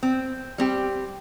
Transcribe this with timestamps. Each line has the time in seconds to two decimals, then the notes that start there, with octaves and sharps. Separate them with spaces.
0.03 C4
0.58 G3 C4 G4